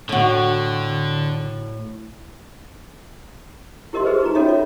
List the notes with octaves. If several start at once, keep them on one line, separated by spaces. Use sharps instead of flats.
A2 D3 F#4
E4 G4 A#4 D#5 E5 C6
G4 G#4 B4 C5
D#4 F4 A#5
C#4 F#4 A4 C#5 D#5 E5
F4 E5